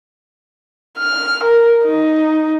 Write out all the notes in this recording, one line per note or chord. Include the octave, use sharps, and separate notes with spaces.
F6
A#4
D#4